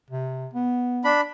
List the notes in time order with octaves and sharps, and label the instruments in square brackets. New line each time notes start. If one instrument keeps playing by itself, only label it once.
[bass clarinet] C3
B3
[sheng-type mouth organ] D4 B5